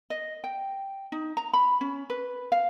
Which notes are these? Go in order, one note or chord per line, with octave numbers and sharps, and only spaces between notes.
D#5
G5
D#4
A#5
B5
C#4
B4
F5